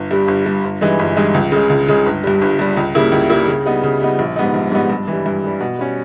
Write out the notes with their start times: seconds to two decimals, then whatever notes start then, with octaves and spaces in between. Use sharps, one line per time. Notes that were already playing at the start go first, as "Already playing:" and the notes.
Already playing: G1
0.11 G2 G3
0.28 G1
0.46 G2 G3
0.64 G1
0.81 G2 E3 G#3 D#4
0.99 G1
1.17 G2 E3 G#3 D#4
1.34 C#2
1.52 C#3 G#3
1.70 C#2
1.88 C#3 G#3
2.06 G1
2.24 G2 G3
2.41 G1
2.59 G2 G3
2.77 C#2
2.95 C#3 G3 A#3 E4
3.12 C#2
3.30 C#3 G3 A#3 E4
3.47 C#3
3.66 G3 B3 D#4
3.84 C#3
4.01 G3 B3 D#4
4.19 A#1
4.36 G#2 G3 B3 D#4
4.54 A#1
4.72 G#2 G3 B3 D#4
4.90 G2
5.08 E3
5.13 G3
5.26 G2
5.44 E3 G3
5.60 B2
5.79 G3 C#4